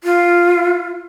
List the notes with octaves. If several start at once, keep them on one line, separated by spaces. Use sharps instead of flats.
F4